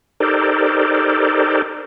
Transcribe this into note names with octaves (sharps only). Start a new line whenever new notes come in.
D#4 G4 A4 A#4 C5 D5